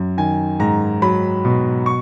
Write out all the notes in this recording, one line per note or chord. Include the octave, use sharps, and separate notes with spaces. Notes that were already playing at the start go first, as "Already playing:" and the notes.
Already playing: F#2
D#3 G#5
G#2 A#5
F#3 B5
B2
C#6